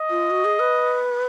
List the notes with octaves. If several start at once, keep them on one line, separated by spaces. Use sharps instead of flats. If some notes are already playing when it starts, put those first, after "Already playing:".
Already playing: D#5
F4
F#4
G#4
B4